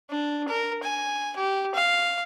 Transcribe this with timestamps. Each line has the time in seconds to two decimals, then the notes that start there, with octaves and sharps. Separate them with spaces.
0.10 D4
0.48 A#4
0.83 G#5
1.36 G4
1.74 F5